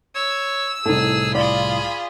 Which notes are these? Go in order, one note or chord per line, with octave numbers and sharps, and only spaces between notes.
C#5 E6
C2 A2 D#4 G#4 A4
F4 G#4 D5 B5